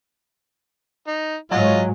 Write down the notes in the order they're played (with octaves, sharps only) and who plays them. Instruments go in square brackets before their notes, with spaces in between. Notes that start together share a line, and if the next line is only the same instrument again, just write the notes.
[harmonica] D#4
[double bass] G#2 G#3 [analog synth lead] F#3 [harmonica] F4 D#5